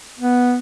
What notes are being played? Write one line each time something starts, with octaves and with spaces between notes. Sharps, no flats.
B3